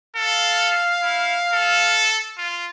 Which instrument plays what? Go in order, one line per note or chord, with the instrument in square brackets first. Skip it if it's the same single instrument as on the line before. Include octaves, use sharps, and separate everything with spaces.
[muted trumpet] A4 [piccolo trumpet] F5
[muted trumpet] E4
A4
F4